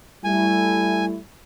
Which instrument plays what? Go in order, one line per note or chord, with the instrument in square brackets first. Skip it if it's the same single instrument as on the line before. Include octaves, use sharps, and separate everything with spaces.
[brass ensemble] G3 A3 E4 [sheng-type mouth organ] G#5